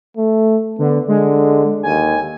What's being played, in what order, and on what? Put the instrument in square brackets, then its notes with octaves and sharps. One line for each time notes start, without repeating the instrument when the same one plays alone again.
[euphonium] A3
[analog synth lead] D3 [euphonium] B3
[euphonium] D3 [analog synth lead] G#3
[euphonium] D#2 [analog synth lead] G#5